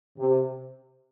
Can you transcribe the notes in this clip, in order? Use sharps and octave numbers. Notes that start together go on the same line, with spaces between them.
C3